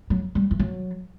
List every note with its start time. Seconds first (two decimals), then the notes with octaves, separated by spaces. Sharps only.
0.10 F#3
0.35 G3
0.51 E3
0.59 F#3